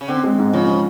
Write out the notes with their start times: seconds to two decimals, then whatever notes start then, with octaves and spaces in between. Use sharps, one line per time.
0.01 C#3
0.08 D3 C4
0.24 G#3
0.39 G#2
0.53 C#3 F3
0.68 G#3